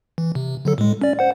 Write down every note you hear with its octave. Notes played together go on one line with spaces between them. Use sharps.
E3
C3
D3 F#3 A4
A2 G#3
C#4 D5
C5 F#5